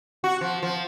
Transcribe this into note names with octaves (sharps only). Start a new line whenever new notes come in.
F#4
F3
F3